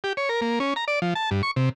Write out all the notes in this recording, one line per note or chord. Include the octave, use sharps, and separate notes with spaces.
G4
C#5
A#4
A#3
C#4
A#5
D5
F3
A5
G2
C#6
C3